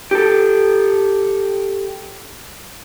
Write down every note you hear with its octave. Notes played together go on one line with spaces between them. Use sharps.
G4 A4